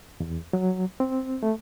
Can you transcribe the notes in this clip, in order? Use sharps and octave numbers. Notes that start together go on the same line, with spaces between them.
E2
F#3
C4
A3